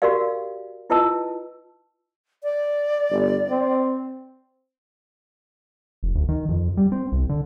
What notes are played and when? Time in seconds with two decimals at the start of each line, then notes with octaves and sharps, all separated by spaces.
0.02 F#4 G4 A#4 D5 F5
0.90 E4 F4 B4 D#5 A5 E6
2.43 D5
3.10 G1
3.49 C4
6.03 F1
6.15 D2
6.29 D#3
6.49 F2
6.77 G3
6.92 C4
7.12 C2
7.29 D3